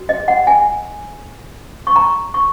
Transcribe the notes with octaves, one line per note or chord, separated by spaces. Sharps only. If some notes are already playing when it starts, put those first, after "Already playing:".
Already playing: F#4
D#5
F#5
G#5
C#6
A#5
C#6